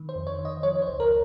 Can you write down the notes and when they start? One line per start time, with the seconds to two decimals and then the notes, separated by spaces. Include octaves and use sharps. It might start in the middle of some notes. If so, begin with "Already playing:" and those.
Already playing: D#3
0.09 C5
0.15 F2
0.27 C#5
0.39 D#3
0.45 D#5
0.63 F3 C#5
0.75 C#5
0.82 C5
0.88 C#2
1.00 A#4